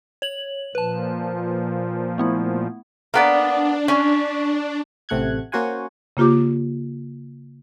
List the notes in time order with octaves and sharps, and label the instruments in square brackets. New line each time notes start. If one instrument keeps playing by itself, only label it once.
[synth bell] C#5 F#7
[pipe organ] A#2 F3 [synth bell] B4 A5
[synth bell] A3 B3 E4
[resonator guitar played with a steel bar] A#3 B3 D5 [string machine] D4
[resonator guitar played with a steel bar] C#4
[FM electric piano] A1 C3 A3 F#5 F#6 G#6
A#3 C#4 F#4 C5 F#5 G#5
[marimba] C#3 A#3 F4 G4 D6